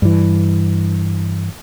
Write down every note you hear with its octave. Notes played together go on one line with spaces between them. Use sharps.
G2 E3